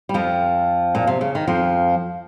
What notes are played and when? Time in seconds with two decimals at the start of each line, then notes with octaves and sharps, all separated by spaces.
0.09 G3
0.14 F2 F3
0.95 A#2
1.07 C3
1.21 C#3
1.35 D#3
1.48 F2 F3